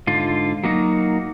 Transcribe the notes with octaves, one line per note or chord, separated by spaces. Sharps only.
G#2 D3 F4
F#3 A#3 D#4 F#4